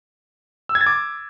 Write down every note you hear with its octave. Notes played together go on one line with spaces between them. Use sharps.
E6
G#6
A6
D6